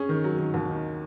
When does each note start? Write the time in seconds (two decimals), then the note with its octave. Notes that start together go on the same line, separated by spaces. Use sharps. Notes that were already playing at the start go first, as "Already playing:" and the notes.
Already playing: C#4 G#4
0.09 D#3
0.24 F#3
0.39 D#3
0.54 D#2
0.69 D#3